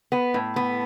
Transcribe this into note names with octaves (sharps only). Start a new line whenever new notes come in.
B3
A2
B3